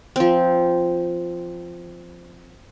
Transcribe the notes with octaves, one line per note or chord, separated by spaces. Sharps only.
F3 C4